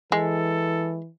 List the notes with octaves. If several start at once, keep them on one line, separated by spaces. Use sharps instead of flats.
E3 G#3 A4